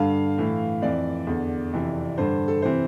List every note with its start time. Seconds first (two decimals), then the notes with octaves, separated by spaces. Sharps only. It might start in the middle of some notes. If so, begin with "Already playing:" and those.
Already playing: G2 D3 F5
0.38 A2 E3
0.82 F2 E3 D5
1.27 E2 D3
1.73 F2 C3 E3
2.18 G2 D3 C5
2.48 A4
2.62 C3 E3 C5